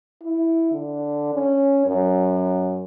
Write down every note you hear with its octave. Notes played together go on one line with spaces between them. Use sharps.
E4
D3
C#4
F#2